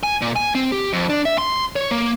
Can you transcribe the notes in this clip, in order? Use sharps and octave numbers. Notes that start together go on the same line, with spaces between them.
G#5
A#2
G#5
C4
G4
F2
D4
E5
C6
C#5
A#3